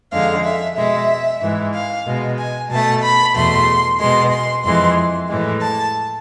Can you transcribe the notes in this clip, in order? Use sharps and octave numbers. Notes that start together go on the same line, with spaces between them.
F2 D3 G#3 F5
E5
B2 G#3 E5
G#2 E3 G#3
F5
B2 G#3
G#5
B2 A3 A5
B5
E2 B2 A3 C6
B2 G#3 C6
C6
F2 E3 G#3 C6
A2 E3 G#3
A5